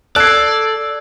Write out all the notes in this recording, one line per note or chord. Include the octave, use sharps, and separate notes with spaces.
A4 D5 E6 F#6 G#6 C7